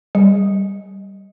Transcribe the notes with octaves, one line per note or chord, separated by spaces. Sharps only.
G3